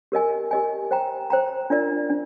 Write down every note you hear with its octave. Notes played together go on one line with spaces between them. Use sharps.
G4 A#4 D#5 G#5
G4 A#4 D#5 G#5
C5 G5 A#5
C5 G5 A#5
D4 F4 A#4 D5
D4